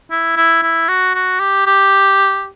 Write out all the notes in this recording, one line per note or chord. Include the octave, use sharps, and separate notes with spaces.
E4
E4
E4
F#4
F#4
G4
G4